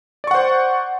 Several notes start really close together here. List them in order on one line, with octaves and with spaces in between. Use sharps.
D5 C#6 F#5 C5